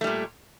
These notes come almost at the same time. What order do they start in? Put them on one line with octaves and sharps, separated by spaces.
A3 G3 A#2